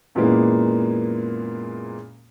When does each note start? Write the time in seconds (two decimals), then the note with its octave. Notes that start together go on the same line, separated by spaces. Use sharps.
0.15 F#2 A#2 E3 G#3 A#3 B3